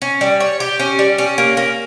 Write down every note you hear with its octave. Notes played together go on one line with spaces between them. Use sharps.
C#4
G3
C#5
G4
C#4
G3
C#4
A#3
A#3